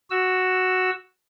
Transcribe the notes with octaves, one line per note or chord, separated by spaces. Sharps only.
F#4 E6